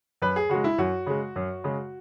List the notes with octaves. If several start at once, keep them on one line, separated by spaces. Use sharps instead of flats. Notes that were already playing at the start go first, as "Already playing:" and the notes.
F#2 B4
G#4
C#3 G#3 F#4
E4
F#2 F#4
C#3 G#3
F#2
C#3 G#3